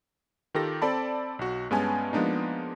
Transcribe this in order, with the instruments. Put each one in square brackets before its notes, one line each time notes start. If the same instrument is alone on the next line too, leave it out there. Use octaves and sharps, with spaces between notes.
[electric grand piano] D#3 F4 G4 A4 A#6
C4 A4 D5 A5 B5
B1 F#4
G2 G#3 B3 C#4 G#5 A5
F3 G#3 A#3 B3 D4 D#4